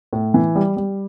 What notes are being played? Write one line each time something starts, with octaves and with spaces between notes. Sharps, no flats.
A2
E3
G3
G3